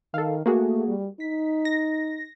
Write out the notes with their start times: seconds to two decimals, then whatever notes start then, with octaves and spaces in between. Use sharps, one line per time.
0.14 D#3 A4 F5
0.46 A3 A#3 F#4 G#4
0.88 G3
1.20 D#4 B6
1.65 A#6